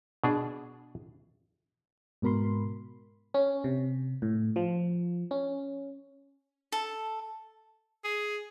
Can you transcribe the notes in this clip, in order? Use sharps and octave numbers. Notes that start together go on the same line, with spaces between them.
B2 D4 G#4
G#2 B2 A#4 B5 C6
C#4
C3
A2
F3
C#4
A4
G#4